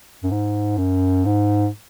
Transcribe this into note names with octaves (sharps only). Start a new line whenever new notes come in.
F#2
G#2
F#2
G#2